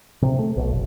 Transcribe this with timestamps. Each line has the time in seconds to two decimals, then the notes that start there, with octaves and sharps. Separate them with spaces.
0.22 C3
0.39 A3
0.57 B1
0.71 F#1